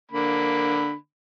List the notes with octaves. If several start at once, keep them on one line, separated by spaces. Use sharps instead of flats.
D3 A#3 B5